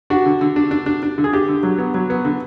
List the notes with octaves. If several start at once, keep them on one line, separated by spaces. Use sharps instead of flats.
D4 F#4
D3
D3
D4
D4
D4
D4
D3
G#4
D4 G4
D3
F#3
B3
F#3
B3
D3